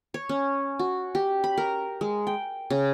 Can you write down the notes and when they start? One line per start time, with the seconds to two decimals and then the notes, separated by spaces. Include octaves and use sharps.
0.14 C#5
0.29 C#4
0.79 F#4
1.15 G4
1.44 B5
1.57 A#4
2.01 G#3
2.27 G5
2.70 C#3